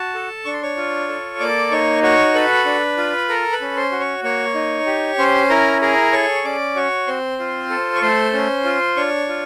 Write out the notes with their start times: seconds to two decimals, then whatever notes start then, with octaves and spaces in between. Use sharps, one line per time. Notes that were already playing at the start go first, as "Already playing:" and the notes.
Already playing: F#4 A5
0.15 A4
0.45 D4 C#6
0.54 C6
0.63 C#5 C#6
0.77 F4
1.09 A4
1.40 A#3 D5 D6
1.71 D#4 C#5 C#6
2.03 F#4 C#5 C#6
2.34 A4 B4 B5
2.66 D4
2.97 F4
3.29 A4 A#4 A#5
3.52 B4 B5
3.61 C#4
3.77 C5 C6
3.92 F#4
4.00 C#5 C#6
4.23 A#3 C#5 C#6
4.55 D#4
4.86 G4
5.18 C#4 C5 C6
5.50 E4 A#4 A#5
5.81 G#4 A#4 A#5
6.12 A4 C#5 C#6
6.45 C#4 D5 D6
6.75 F#4 C#5 C#6
7.07 C4 C5 C6
7.40 F4
7.70 A4
7.95 C#6
8.02 A3 C5 C6
8.33 C#4
8.65 F4
8.96 D4 C#5 C#6
9.29 F4